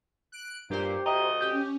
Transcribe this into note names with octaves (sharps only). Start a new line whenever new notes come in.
F#6 D7
G2 A#2 G4 C5
D2 D#5 E5 G5 A#5
C#4 G4 G6